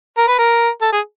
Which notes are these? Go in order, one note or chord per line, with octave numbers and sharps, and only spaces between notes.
A#4
B4
A#4
A4
G#4